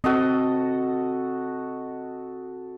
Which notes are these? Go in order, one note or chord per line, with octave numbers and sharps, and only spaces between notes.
C4 F#4 A4 D#5